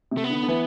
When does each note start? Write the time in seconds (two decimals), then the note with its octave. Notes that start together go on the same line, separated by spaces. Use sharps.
0.11 C3
0.17 A3
0.24 B3
0.30 D3
0.43 D3
0.48 E3